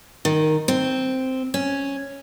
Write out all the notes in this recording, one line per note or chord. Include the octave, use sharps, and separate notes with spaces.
D#3
C4
C#4